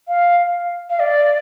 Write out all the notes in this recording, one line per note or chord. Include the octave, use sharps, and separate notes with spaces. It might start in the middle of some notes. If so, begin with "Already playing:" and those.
F5
F5
D5